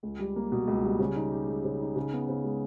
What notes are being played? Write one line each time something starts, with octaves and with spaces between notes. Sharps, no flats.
C#2
G3
A#3
B2
C#2
G3
C#3
D#4
G4
G#3
C#3
D#4
C#3
B3
C#3
G#3